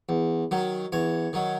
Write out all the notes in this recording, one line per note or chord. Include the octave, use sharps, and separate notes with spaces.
E2
D#3 F#3
E2 C#5
D#3 F#3